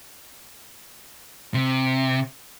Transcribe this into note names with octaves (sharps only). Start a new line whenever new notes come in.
C3